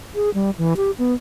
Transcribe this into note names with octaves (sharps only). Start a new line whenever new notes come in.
G#4
G3
E3
G4
B3